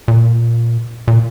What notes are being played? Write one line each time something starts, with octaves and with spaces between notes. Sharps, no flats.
A#2
A#2